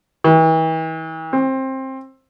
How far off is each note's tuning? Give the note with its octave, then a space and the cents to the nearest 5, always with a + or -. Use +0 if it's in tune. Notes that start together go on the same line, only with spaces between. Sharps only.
E3 -40
C4 +20